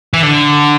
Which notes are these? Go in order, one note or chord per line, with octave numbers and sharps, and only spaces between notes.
E3
D3